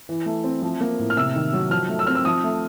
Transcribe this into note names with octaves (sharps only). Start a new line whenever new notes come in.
E3
A3
C4
F3
A#3
A2
F6
C3 E6
D#3
F#3
F3 F6
A3
E6
C4 F6
E6
F3 D#6
A3